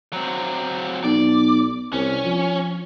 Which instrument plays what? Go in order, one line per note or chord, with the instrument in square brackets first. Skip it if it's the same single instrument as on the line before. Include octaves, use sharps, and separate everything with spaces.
[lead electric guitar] F#3 C4
[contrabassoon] B1 [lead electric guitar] D5
[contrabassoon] C2 [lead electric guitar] C#4
[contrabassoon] F3